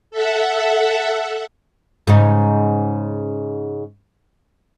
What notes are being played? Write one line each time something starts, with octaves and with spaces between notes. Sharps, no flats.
A4 E5 F#5
G#2 C#3 D#4